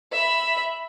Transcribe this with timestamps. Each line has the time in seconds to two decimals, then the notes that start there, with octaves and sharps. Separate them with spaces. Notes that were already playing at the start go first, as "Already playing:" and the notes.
0.12 E5 B5